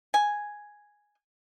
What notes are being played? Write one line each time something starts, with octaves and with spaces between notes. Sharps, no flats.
G#5